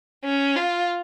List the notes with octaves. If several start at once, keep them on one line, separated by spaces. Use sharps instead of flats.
C#4
F4